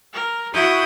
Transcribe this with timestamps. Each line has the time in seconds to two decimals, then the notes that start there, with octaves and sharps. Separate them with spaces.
0.13 A#4
0.52 E4 F#4 D#6 G6